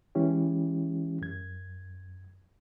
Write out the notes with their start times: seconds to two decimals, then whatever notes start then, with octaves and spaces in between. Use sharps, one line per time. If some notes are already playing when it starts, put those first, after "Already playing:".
0.15 E3 G#3 C#4 E4 G4
1.21 F#2 G#6